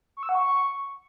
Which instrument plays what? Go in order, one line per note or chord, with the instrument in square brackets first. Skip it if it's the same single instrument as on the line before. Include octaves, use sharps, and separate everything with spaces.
[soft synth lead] C#6
E6
F#5
C#6